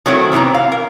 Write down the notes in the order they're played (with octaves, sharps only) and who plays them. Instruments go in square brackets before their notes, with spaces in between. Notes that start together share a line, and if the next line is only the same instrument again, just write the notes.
[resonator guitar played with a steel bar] D#3 F#3 A3 C4 E4
C3 E3 B3 C4 A#5
F5
A#4